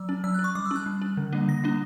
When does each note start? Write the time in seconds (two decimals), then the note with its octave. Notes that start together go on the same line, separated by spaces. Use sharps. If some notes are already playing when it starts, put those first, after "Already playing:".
Already playing: F#3 E6
0.09 C#4
0.24 F#3 E6
0.34 F#6
0.39 C#4
0.44 C#6
0.55 G3 D6
0.66 E6
0.71 C#4 F#6
0.86 G3
1.02 C#4
1.17 D3
1.32 G3 A#3 D4
1.48 D3 A#6
1.64 G3 A#3 D4